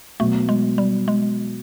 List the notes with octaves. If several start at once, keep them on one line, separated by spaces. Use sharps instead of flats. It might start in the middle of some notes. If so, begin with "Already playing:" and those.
B2 F#3 A3 B3
G#3
G3
G#3